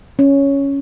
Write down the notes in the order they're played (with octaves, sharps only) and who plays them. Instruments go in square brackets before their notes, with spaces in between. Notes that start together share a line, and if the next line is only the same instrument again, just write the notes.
[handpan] C#4